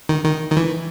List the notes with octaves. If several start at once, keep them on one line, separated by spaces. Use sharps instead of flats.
D#3
D#3
D#3
E3